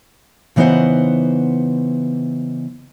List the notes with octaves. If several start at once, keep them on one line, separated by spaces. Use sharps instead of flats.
C#3 E3 B3 D#4 C5 F#5